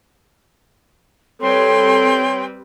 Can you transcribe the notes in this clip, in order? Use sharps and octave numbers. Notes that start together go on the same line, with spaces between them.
G3 C4 A4 B4 C#5 G5 C6